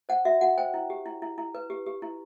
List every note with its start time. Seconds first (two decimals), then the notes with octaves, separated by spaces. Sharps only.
0.09 C5 F#5
0.25 F#4 E5
0.41 F#4 F#5
0.58 C5 G5
0.74 E4
0.90 G4
1.06 E4
1.22 E4
1.38 E4
1.55 B4
1.70 G4
1.86 G4
2.02 E4